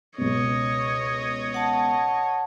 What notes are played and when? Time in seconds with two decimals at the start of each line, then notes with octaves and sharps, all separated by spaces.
0.18 C#2 B2 C#5 D#5
1.54 F#5 A5